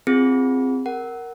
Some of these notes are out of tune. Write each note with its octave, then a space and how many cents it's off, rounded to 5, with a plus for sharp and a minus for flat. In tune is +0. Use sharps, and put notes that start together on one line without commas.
C4 +0 F4 -5 G#4 -15
A#4 +0 F#5 +15